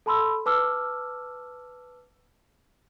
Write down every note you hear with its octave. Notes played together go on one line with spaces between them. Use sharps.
A4 A5 B5 C6 E6
B4 A5 D6 E6 F6